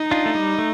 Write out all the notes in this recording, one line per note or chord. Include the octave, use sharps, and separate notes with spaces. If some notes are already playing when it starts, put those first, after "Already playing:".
Already playing: D#4
D4 F4
A3
G3
A3